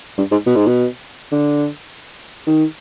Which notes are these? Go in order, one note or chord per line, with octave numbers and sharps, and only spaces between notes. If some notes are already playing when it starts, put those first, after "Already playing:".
G2
G#2
B2
G#2
B2
D3
D#3